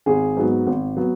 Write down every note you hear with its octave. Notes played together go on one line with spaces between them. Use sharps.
G#1 G#4
G#2 F#3 B3
G#1
F#3 B3